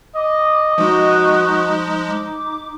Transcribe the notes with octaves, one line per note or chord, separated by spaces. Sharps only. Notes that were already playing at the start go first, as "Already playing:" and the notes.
D#5 D6
F3 G#3 D#4 F#4 C#6
D6